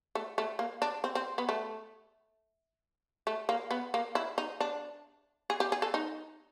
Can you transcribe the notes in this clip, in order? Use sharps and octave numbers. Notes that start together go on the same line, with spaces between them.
A3
A3
A#3
D4
C4
C4
B3
A3
A3
A#3
B3
A#3
E4
D#4
D4
G#4
G4
G#4
A4
D#4